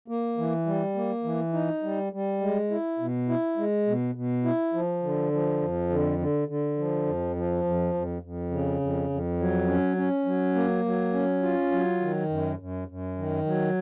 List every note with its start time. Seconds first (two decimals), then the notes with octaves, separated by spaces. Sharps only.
0.08 A#3
0.38 E3
0.66 G3
0.95 A#3
1.24 E3
1.53 D#4
1.83 G3
2.13 G3
2.41 G#3
2.70 E4
2.99 B2
3.29 E4
3.57 G#3
3.87 B2
4.15 B2
4.45 E4
4.74 F3
5.03 D3
5.32 F3
5.62 F2
5.90 D3
6.19 D3
6.48 D3
6.77 F3
7.06 F2
7.36 F3
7.64 F2
7.94 F2
8.22 F2
8.51 C#3
8.81 F2
9.10 F2
9.40 F#3
9.68 C#4
9.97 C#4
10.26 F#3
10.55 A#3
10.85 F#3
11.13 C#4
11.42 F4
11.72 F#3
12.00 D#3
12.29 F#2
12.59 F#2
12.88 F#2
13.18 D#3
13.46 F#3